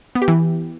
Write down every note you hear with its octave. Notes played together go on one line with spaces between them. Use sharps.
B3
G4
E3